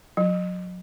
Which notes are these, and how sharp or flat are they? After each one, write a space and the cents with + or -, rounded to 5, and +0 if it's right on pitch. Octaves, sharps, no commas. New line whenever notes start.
F#3 -35